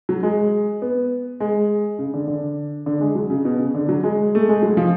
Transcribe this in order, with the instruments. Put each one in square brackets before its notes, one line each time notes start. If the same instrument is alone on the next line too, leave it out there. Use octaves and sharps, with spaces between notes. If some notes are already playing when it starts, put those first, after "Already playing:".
[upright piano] F#3
G#3
B3
G#3
C#3
D3
D3
D3
G#3
F#3
C#3
B2
C#3
D3
F#3
G#3
A3
G#3
F#3
F3